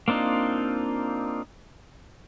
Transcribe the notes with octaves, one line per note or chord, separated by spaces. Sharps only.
A#3 C4 D4 D#4 F4